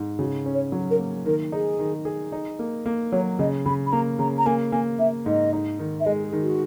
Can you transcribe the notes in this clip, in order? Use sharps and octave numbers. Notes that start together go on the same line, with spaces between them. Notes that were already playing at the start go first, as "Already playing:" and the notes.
Already playing: G#2
C#3 F#4
C#4
C#5
F#3
A#4
A#3
D#3 A#4
D#4 G#4
D#3
G#4
D#4
A#3
A#3
F#3 C#5
C#3 D#5
C#3 B5
B5
A#3 A#5
C#3 A#5
A#5
A#3 G#5
A#3 G#5
A#3 E5
G#2 D#5
D#4
D#3
E5
G#3 D#5
G#4
D#3
F#4